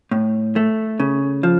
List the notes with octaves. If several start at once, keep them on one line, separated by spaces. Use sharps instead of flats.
A2
A3
C#3
F3